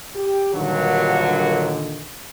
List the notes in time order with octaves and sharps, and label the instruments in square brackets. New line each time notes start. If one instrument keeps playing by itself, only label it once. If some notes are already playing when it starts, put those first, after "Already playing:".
[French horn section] G4
[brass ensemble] G2 F#3 [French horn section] A#2 D3 D#3